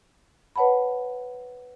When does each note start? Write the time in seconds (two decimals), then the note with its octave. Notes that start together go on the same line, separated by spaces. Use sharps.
0.56 B4 C#5 F#5 A5 B5